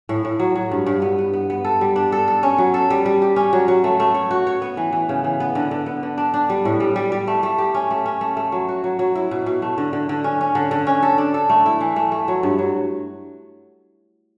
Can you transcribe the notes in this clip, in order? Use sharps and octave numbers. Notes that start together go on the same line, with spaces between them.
A2
A2
F#3
F#3
G2
G2
B3
B3
B3
B3
A4
G3
D4
A4
A4
C#4
F#3
A4
G3
G3
G4
C#4
F#3
F#3
A3
A3
C#5
F#4
C#5
B3
E3
E3
C#3
E3
B3
D3
D3
B3
D3
D4
D4
G3
A2
G3
G3
G3
A3
A3
G4
C#4
A3
C#4
A3
A3
F#3
F#4
F#3
F#3
E4
B2
B2
A3
D3
D3
D3
C#4
C#4
D3
D3
C#4
A4
D4
A4
A3
E4
E3
A3
A3
F#3
G2
F#3